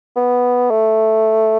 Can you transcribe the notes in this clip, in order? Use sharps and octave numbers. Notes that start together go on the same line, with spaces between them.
B3
A3